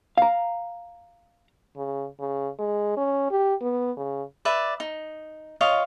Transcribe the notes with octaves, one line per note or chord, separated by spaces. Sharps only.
F5 A#5
C#3
C#3
G#3
C#4
G4
B3
C#3
B4 D5 E5
D#4
F4 C#5 D#5 F5